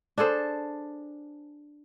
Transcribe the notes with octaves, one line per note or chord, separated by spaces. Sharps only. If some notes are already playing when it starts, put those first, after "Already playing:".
D4 G#4 A4 C5